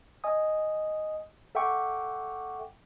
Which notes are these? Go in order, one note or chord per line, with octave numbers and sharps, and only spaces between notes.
D#5 G#5 D#6
A4 E5 F#5 G5 C#6 D6